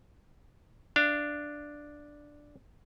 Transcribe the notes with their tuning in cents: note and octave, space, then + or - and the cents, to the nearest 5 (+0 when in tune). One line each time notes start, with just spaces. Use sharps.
D4 +0 F5 -35